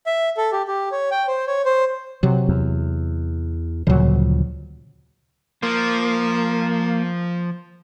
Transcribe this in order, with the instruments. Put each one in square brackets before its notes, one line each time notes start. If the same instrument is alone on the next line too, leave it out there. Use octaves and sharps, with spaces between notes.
[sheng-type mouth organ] E5
A4
G4
G4
C#5
G5
C5
C#5
C5
[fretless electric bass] C3 F#3
[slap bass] E2
[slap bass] D2 C#3 F3 [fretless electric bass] A#2 F#3
[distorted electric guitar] F3 [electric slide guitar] A#3